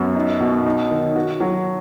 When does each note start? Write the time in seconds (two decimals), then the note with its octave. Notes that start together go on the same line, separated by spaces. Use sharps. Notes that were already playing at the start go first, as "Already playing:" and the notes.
Already playing: F#2 B3
0.15 D#4
0.40 B2
0.66 D#4
0.91 D#3
1.16 F#4
1.40 F#3